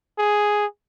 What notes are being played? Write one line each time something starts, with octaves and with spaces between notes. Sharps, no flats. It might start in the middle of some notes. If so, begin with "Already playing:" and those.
G#4